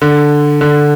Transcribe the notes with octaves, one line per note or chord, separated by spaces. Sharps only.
D3
D3